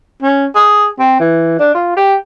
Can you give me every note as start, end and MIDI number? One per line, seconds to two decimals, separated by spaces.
0.22 0.46 61
0.55 0.87 68
0.99 1.17 60
1.20 1.55 52
1.59 1.72 62
1.74 1.95 65
1.96 2.15 67